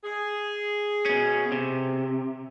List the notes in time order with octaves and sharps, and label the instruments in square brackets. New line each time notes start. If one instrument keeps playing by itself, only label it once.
[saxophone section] G#4
[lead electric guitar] B2 C#4
C3